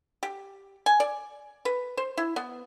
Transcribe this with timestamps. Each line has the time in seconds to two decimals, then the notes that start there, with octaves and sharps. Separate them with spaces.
0.23 G4
0.86 G#5
1.00 D5
1.65 B4
1.97 C5
2.17 E4
2.36 B3